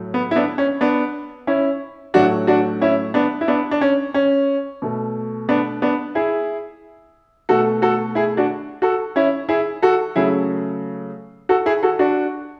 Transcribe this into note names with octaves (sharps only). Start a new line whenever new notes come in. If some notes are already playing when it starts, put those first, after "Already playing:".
Already playing: A2 F#3 A3
B3
E4
B3 D4
C#4
B3 D4
C#4 E4
A2 F#3 A3 D4 F#4
D4 F#4
C#4 E4
B3 D4
E4
B3 D4
D4
C#4
C#4
B2 A3
B3 D4
B3 D4
E4 G#4
B2 A3 F#4 A4
F#4 A4
E4 G#4
D4 F#4
F#4 A4
C#4 E4
E4 G#4
F#4 A4
C#3 F#3 A3 E4 G#4
F#4 A4
E4 G#4
F#4 A4
D4 F#4